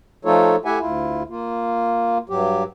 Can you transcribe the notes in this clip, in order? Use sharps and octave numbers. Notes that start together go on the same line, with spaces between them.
F3 A3 D#4 F4 A4 C#5
A3 E4 G4 E5 F#5 G#5
D2 E4 F4
A#3 F4
G2 F#3 G4